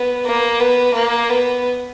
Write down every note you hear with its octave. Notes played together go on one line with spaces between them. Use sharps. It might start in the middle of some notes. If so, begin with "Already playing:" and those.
Already playing: B3
A#3
B3
A#3
B3